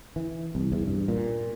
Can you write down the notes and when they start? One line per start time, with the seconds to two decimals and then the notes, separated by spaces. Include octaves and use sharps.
0.16 E3
0.55 C2
0.72 E2
0.87 G2
1.08 A#2